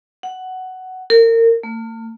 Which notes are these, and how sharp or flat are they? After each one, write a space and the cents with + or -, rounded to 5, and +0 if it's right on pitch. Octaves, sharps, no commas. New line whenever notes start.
F#5 +10
A#4 -30
A3 +45